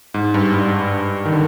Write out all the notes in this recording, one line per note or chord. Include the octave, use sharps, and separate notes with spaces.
G#2
G2
G2
D#3
D3